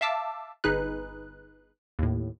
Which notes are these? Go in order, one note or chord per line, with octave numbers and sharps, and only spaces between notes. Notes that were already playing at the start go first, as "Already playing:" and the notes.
E5 F5 A5 D6 E6
G1 D#4 G#4 B4 F#6
D#2 A2